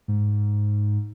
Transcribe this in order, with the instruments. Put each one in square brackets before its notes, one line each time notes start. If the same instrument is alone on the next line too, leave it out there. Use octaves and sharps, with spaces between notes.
[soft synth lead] G#2